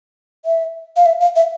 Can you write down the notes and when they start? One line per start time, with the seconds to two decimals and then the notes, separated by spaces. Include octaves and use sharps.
0.45 E5
0.97 F5
1.06 E5
1.21 F5
1.36 E5